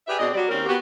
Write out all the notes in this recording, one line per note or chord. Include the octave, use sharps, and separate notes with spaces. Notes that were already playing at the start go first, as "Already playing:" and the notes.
G4 G#4 B4 D5 E5
B2 C4 D4 G#4 D5 D#5
F#3 G3 D5
D#2 C4 C#4 A#4
B3 F#4 G4